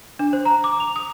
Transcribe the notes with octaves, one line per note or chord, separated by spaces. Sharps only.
D4
C5
A#5
D6
F7
D#6